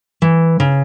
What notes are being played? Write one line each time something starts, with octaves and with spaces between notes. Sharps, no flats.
E3
C#3